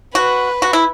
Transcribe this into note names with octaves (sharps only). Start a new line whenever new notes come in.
F#4 B4
F#4
E4